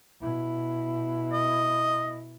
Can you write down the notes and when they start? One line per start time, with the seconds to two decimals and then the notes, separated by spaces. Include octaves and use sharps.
0.20 B2 E4
1.33 D#5